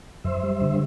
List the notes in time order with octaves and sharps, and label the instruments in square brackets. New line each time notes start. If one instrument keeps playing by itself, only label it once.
[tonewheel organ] F#2 C5 E5
G3
D3